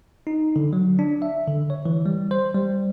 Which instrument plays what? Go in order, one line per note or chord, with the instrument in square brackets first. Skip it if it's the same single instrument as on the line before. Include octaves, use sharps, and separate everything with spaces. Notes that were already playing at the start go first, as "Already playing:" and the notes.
[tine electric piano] D#4
D3
F#3
D4
E5
D3
C#5
E3
G3
C5
G3